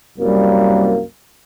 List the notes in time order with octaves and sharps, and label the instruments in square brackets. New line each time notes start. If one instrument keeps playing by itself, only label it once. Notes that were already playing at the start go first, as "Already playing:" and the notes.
[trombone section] C2 F#2 A#3 [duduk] G3